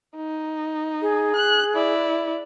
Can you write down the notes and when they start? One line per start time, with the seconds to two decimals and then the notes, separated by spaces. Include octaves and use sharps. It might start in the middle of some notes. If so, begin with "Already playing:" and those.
0.16 D#4
1.02 G#4
1.36 F#6
1.75 E4 D5